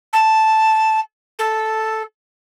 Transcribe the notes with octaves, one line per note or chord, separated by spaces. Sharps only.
A5
A4